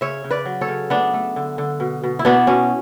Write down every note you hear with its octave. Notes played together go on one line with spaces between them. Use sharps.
C#3 C#5 E5
C#3
B4 D5
F#3
A4 C#5
C#3
A3 B3 D4
A3
D3
D3
B2
B2
E4
B2 B3 D4
B2 C#4